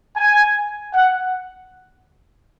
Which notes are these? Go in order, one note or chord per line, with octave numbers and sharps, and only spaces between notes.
G#5
F#5